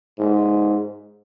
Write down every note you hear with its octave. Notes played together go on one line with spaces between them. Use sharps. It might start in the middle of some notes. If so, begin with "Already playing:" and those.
G#2